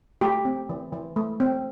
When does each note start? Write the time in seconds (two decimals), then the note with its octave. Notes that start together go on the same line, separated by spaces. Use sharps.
0.21 A3 G4
0.45 C4
0.69 E3
0.93 E3
1.16 A3
1.40 C4